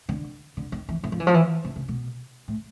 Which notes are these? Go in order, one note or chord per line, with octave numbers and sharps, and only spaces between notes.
D3
D3
D#3
E3
E3
F3
E3
F3
E3
D3
C#3
B2
A2